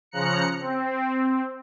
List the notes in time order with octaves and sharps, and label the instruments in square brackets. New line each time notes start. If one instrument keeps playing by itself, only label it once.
[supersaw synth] C#3 F3 A#5 F#6 C#7
C4